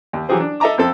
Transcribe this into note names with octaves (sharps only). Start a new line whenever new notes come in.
D#2
E3 F#3 G4 G#4 C5
D4
A4 D#5 E5 A5 A#5 D6
F2 C4 A4